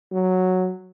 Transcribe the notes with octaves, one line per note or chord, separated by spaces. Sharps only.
F#3